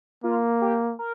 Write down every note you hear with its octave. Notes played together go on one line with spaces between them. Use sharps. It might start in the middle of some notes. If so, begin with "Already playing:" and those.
A#3 F4
G4
A#4